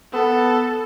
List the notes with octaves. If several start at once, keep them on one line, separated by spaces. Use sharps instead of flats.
B3 A4